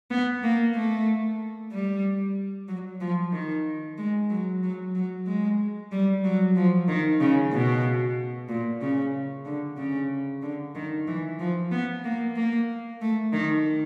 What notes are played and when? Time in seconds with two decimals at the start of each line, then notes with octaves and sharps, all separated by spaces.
0.11 B3
0.44 A#3
0.75 A3
1.72 G3
2.68 F#3
3.01 F3
3.33 D#3
3.98 G#3
4.30 F#3
4.63 F#3
4.95 F#3
5.27 G#3
5.92 G3
6.24 F#3
6.56 F3
6.88 D#3
7.21 C#3
7.53 B2
8.49 A#2
8.82 C#3
9.46 D3
9.78 C#3
10.42 D3
10.75 D#3
11.08 E3
11.40 F3
11.72 B3
12.05 A#3
12.36 A#3
13.02 A3
13.33 D#3